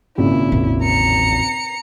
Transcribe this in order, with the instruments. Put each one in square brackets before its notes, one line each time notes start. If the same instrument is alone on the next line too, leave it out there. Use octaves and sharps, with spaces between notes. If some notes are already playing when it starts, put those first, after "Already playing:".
[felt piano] G#1 A#2 C#3 [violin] E4
[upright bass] A1 E2
[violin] A#5 C#7